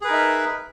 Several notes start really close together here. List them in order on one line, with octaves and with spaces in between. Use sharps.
G#4 B4 A#4 D#4 E5